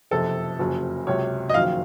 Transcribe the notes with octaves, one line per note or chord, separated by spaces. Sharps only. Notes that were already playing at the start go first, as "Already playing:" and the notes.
F#1 F2 C3 F3 A4
F#1 F2 C#3 F#3
C#2 C3 F#3 C#5
D#5
F#1 F2 D#3 F#3 F5